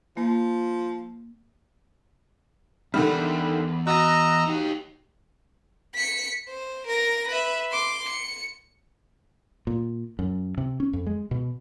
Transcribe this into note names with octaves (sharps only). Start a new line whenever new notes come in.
F3 A#3
E2 D3 D#3 G3 F#5
F#4 D#5 A#5 E6 A#6
D#4 G4
B6 C#7
C5
A#4 A#6
B4 E5
C6 D6
C#7
A#2
F#2
C3
C#4
F2
G#3
B2